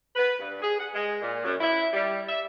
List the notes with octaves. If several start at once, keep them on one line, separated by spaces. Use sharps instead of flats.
B4
G2
G#4
F#5
G#3
A#2
F#2
E4
G3
E5